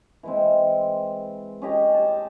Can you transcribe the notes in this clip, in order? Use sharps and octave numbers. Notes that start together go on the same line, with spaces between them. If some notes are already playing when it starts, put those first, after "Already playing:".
E3 G#3 C4
C#4 G4 D#5 G#5
G4 A5